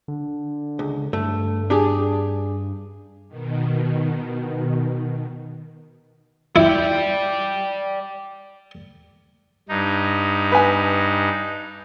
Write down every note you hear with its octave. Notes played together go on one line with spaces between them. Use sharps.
D3
C#2
G2 A3
D4 G4 G#4
B2 D#3
E4 D5 G5
G2 D#4
B4 G#5